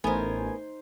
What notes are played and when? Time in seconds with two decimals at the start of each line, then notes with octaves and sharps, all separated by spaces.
0.04 A1 A3 B3 D#4 A#4 C5 G#5 G#6